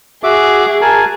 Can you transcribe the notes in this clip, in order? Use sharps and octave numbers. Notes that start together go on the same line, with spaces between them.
F#4 G#4 E5 D6
A#4 G#5 A5